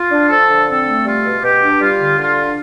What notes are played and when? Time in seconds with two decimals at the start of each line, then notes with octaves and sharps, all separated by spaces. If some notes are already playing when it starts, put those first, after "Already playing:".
Already playing: F4
0.11 D4
0.29 F3 A4
0.48 D3
0.67 C4 A4
0.86 A3
1.05 G3 F4
1.23 B2
1.42 B2 G4
1.61 D4
1.80 G3 F4
1.99 D3
2.17 D3 F4
2.37 D4